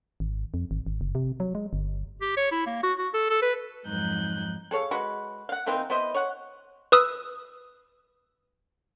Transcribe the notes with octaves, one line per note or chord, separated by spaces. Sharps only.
G#1
F2
G#1
G#1
F#1
C3
F#3
G#3
G1
G4
C#5
E4
A#3
F#4
F#4
A4
A4
B4
F2 G#2 F#3 D#4 F#6 G6
G#4 A4 C#5 F5
G#3 F#4 B4
F5 F#5
E3 A#3 C4 D#4
B3 E4 C5 D#5
C#5 F#5
B4 D#6 E6